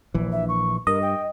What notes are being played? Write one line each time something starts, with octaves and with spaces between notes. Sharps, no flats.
A#1 E3
E5
C#6
G2 A#4 D#5
G5